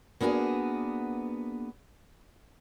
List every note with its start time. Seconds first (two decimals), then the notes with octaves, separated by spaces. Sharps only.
0.21 A#3 B3 D4 F#4 G#4